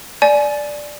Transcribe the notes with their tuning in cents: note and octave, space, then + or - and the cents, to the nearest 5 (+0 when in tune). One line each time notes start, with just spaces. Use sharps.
D5 +0 G#5 +25